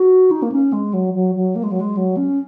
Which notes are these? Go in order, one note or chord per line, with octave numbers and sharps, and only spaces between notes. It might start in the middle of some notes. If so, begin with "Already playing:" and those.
Already playing: F#4
D#4
A#3
C#4
G#3
F#3
F#3
F#3
A#3
G#3
F#3
G#3
F#3
C#4